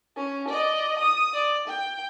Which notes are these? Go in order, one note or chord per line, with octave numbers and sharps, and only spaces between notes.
C#4
D5 D#5
D#6
D5
G5